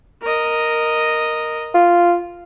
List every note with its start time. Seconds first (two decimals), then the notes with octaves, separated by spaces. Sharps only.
0.22 A#4 D#5
1.74 F4